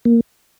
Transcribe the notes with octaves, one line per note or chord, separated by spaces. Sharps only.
A#3